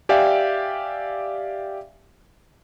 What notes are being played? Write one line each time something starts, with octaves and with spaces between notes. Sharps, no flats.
G4 D5 E5 F5 G5 G#5